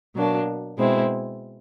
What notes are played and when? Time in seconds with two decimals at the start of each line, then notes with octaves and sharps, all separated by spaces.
0.15 B2 F#3 A#3 D4
0.77 B2 G#3 C4 E4